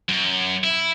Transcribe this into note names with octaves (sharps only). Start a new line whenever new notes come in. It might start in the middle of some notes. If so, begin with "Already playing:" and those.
F#2
E4